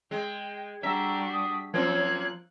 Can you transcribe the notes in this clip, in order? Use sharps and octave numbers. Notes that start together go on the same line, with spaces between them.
G#3 G5
G3 D4 F#4 E5 A#5 B6
D#6
F#2 F3 A#3 C4 F#6 G#6